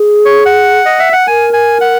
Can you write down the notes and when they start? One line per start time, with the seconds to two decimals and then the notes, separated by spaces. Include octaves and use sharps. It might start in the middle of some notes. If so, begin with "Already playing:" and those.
Already playing: G#4
0.25 C#5
0.45 F#5
0.85 D#5
0.99 E5
1.13 F#5
1.27 A#4 G#5
1.53 G#5
1.81 F#5